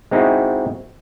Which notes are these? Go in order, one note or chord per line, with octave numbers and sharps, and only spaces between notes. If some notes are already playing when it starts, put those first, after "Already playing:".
G#3 C4 D#4 E4 F#4 G#4